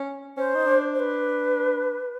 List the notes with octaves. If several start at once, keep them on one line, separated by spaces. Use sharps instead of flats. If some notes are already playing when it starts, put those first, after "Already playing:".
Already playing: C#4
C#4 C5
D#4
D4
C5
B4